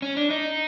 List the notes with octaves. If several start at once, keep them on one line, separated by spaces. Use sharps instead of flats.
C#4
D4
D#4